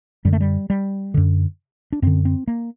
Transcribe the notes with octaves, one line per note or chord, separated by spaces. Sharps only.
F#2 D3 G3
A3
G3
G3
F#2 D3
D4
F#2 D3 C4
C4
A#3